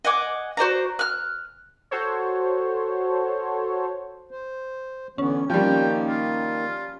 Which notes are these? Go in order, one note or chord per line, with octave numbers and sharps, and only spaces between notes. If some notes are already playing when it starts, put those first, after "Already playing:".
D#5 F#5 G#5 D6
F#4 C5 D5 A#5
F6 F#6
F#4 A4 C5 C#5
C5
D3 E3 B3 C#4
D#3 F3 G3 A#3 G5
F4